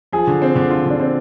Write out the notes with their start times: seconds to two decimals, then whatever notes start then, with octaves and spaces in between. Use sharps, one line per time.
0.12 F3 G#4
0.27 D3
0.42 C4
0.56 D3
0.70 F3 F4
0.86 D3 D4
1.00 C4